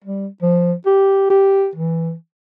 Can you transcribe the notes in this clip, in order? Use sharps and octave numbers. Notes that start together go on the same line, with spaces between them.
G3
F3
G4
G4
E3